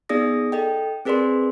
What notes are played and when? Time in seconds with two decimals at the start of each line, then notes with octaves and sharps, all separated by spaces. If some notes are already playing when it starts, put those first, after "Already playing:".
0.09 B3 D#4 G#4 D5 D#6 A#6
0.52 A4 D#5 G5
1.05 C4 G#4 A#4 B4 D5 C6